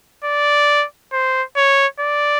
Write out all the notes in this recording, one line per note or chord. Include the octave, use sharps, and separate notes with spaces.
D5
C5
C#5
D5